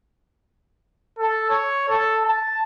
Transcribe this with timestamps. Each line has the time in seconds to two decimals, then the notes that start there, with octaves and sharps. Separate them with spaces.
1.18 A4
1.50 C#5
1.89 A4
2.24 A5